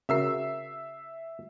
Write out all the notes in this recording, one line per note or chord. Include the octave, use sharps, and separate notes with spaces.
C#3 F#4 A#4 E5 E6 C7